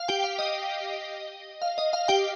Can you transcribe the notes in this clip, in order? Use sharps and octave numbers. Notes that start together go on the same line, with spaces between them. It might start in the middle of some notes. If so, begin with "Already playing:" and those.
Already playing: F5
G4 G5
F5
D#5
F5
D#5
F5
G4 G5